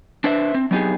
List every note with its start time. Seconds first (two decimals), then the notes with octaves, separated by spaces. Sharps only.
0.24 D4 B4 C5 E5
0.55 C4
0.71 F#3 B3 D#4 G4 G#4